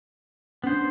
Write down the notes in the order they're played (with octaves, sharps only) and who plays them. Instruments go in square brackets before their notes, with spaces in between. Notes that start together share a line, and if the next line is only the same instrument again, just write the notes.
[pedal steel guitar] B3 C5 [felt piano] C#4 D4